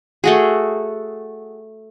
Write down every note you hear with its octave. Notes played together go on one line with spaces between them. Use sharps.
A3 F#4 G#4